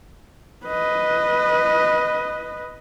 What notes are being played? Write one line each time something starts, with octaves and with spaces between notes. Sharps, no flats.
B4 D#5